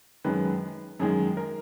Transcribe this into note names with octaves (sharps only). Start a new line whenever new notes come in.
F#2 D#3 G#3 B4
F#2 D#3 G#3 G#4
A#4